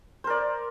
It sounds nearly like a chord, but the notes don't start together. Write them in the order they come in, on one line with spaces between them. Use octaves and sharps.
C5 A#4 D5